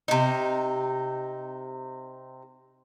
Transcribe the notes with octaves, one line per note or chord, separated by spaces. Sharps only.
C3 D#4